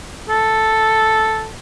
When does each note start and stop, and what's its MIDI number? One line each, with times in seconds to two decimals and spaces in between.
0.29 1.47 69